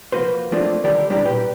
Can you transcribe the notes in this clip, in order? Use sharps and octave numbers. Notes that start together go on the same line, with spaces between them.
F3 A#3 F#4 B4 C5
F3 A3 A#3 C4 D4 F4
D3 D#3 G3 D4 G4 A#4
B1 G3 D4 E4 G4 A#5
A#2 G4 B4 G5